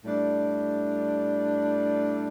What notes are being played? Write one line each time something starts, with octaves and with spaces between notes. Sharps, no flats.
A2 G3 D4